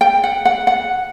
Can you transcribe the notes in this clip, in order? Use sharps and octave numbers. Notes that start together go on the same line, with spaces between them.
G5
F#5
F#5
F#5